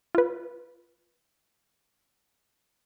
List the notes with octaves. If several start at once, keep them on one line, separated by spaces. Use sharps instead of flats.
F4 B4